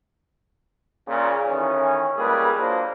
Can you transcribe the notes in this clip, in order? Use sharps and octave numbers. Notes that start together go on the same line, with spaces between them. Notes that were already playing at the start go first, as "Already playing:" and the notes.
A#2 C#3
A1 D#3 E3 C#4
C#2 G3 A#3 G#4 B4
F#3 A#3 D4 F4 C5